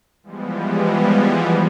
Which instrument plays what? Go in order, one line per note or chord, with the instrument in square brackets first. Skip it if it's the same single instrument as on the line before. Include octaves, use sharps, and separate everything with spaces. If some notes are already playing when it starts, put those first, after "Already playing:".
[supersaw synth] E3 F3 G3 G#3 B3